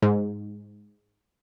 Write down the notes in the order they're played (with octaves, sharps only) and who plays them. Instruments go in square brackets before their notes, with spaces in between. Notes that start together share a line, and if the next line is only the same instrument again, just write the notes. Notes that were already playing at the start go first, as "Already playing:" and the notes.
[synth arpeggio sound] G#2